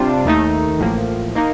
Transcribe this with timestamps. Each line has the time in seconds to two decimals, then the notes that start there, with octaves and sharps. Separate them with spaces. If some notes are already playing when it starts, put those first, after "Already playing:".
Already playing: C3 G3 D4 F4
0.25 D#2 D#3 A3 D#4
0.79 A1 A2 F3 A#3
1.35 D#3 A#3 D#4